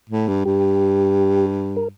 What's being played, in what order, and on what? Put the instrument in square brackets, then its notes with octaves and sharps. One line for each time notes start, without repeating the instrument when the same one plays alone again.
[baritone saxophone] A2
G2
[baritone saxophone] G2 [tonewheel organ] G4
[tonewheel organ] A#4